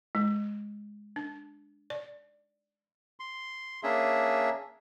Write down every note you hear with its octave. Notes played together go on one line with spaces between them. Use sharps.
G#3
D4
D5
C6
A#3 C#4 D4 G#4 E5